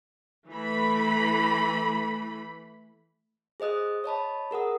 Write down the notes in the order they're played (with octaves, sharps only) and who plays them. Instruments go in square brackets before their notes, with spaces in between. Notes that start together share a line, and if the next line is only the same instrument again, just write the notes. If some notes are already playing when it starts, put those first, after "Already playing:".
[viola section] E3 A3 B5
[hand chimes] G#4 C5 D#5 D#6 F#6
C#5 D#5 A5 B5
G#4 A#4 F#5 D#6